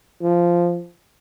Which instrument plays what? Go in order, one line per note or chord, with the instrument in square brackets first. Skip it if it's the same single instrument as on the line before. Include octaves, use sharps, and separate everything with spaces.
[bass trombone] F3